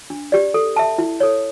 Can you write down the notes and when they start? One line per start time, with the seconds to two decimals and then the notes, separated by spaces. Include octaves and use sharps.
0.10 D4
0.32 G4 D5
0.54 A4
0.76 E5 A5
0.98 E4
1.20 A4 C#5